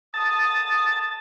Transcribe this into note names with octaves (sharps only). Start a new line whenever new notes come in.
A5 D#6